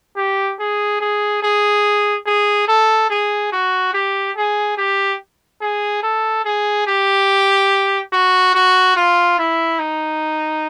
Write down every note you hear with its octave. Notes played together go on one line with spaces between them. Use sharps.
G4
G#4
G#4
G#4
G#4
A4
G#4
F#4
G4
G#4
G4
G#4
A4
G#4
G4
F#4
F#4
F4
E4
D#4